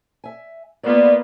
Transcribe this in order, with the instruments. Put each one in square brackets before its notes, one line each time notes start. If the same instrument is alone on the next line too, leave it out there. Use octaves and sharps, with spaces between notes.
[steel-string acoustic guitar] E5 G#5
[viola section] A#3 B3 F4 [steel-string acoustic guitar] D5 F5